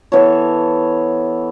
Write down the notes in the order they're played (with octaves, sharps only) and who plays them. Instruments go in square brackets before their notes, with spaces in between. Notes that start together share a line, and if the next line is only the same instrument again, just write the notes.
[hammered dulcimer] E3 B3 A4 C#5